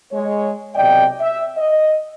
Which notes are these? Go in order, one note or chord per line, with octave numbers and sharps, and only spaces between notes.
G#3 C#5
B1 C3 D5 D#5 G5
E5
D#5